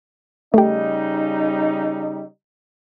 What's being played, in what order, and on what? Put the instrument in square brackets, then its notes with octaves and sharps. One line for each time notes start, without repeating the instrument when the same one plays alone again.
[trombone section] C#3 G3 D#4 [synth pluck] A3 G4